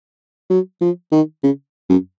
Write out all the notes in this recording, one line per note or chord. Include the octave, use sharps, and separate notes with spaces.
F#3
F3
D#3
C#3
F#2